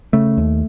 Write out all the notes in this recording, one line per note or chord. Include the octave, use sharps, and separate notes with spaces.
C#3 A3
D#2